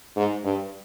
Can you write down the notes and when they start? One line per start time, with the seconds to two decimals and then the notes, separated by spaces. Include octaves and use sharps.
0.16 G#2
0.44 G2